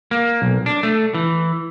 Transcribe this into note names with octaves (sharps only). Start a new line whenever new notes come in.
A#3
B1
D4
A3
E3